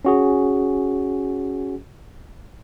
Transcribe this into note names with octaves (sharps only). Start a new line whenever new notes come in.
C#4 F#4 G#4